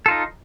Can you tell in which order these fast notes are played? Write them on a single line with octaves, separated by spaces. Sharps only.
A4 F4 D#4